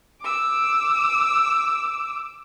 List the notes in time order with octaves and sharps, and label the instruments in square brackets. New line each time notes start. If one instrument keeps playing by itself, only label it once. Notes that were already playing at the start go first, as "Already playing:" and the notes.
[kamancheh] D6 E6